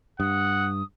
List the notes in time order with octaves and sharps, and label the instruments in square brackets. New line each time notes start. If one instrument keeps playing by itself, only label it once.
[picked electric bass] G2 [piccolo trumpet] F#5 [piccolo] D#6